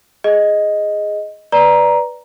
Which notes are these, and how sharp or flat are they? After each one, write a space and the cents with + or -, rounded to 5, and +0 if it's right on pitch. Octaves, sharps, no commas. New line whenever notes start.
G#4 +0 D#5 +0
B4 +0 D5 +0 A#5 +10